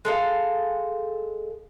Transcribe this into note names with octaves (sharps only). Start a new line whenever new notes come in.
G#3 A4 F5